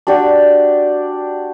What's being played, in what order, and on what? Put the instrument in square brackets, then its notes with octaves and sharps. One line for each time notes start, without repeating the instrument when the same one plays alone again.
[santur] D4 F#4 G4 D5